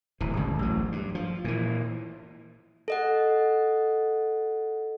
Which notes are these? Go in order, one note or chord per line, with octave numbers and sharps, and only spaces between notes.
D1 E3
G1 C#2
A1 F#3
G2
F3
A#2 E3
A4 D#5 F#5